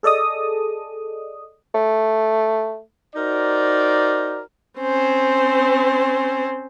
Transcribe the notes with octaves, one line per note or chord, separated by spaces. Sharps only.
G#4 A4 D5 D#5 D#6
A3
D#4 F#4 A#4 C5 D5
C4 C#4 C5